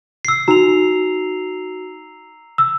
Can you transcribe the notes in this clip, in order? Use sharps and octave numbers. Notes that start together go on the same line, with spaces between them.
E6 C7
D#4 F#4 A#5 F7
E6